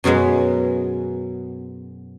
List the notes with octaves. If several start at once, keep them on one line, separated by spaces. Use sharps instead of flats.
F#2 B2 F#3 G#3 B3